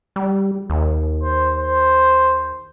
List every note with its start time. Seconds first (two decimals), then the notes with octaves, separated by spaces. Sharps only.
0.16 G3
0.70 D#2
1.23 C5
1.59 C5